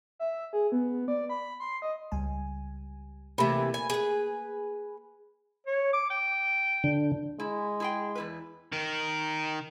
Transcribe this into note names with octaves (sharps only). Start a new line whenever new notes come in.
E5
G#4
B3
D5
B5
C6
D#5
C#2 G3 G#5
C3 E3 A3 A#3 B5
G#5
G#4 B4
C#5
D6
G5
D3
G#3 E4
E4 G#4 G5
E2 E4 B4
D#3 A#4